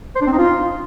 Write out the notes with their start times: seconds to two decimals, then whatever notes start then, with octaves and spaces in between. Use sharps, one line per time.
0.16 C5
0.21 D4
0.27 C4
0.32 D#4
0.38 F4